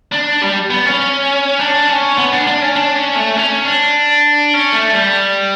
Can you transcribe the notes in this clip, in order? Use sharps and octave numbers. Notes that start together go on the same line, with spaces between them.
D4
G3
B3
C#4
D4
C#4
B3
D4
D4
C#4
D4
C#4
A3
C#4
D4
C#4
A3
G3